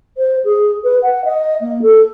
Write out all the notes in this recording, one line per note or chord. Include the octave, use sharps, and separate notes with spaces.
C5
G#4
B4
F#5
D#5
A#3
A4